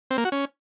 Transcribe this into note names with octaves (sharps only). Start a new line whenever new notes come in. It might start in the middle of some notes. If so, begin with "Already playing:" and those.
C4
A#3
F#4
C#4